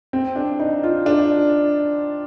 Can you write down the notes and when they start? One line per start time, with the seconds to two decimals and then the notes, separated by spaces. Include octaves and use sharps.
0.13 C4
0.36 D4
0.60 D#4
0.83 F4
1.06 D4